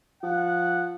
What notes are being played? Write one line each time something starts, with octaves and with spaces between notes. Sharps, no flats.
F3 F#5